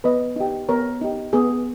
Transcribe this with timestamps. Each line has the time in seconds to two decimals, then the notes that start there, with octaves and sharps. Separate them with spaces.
0.04 B3 B4 D#5
0.36 D#4 G4
0.69 B3 A#4 C#5
1.01 D#4 G4
1.33 B3 G#4